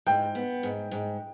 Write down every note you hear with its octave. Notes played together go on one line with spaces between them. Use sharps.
G#2 G5
B3
G#2
G#2